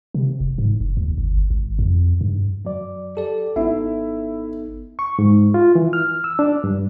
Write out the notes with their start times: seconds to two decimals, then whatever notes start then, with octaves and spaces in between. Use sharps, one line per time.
0.14 C3
0.40 E1
0.58 G#2
0.81 F1
0.97 D#2
1.18 G1
1.50 G#1
1.79 F2
2.21 G2
2.65 F#2 F#3 D5
3.17 G4 A4 D5
3.56 G#1 B3 D#4 E4
4.99 C#6
5.19 G#2
5.54 F4
5.75 E3
5.93 F6
6.24 E6
6.39 D4
6.64 G2